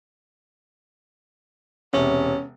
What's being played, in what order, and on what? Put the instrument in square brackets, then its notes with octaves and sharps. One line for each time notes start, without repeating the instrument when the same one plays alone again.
[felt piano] E1 C3 [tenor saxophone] C#4